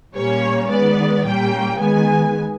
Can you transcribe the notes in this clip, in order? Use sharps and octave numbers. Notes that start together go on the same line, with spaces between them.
A#2 G3 A#3 C#4 C#5
D#3 G#3 B3 D5
A#2 G3 A#3 C#4 G5
D#3 G#3 B3 G#5